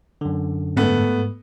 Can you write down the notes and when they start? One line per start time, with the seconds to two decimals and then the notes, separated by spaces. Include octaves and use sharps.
0.21 F#2 D3
0.77 G#2 A3 B3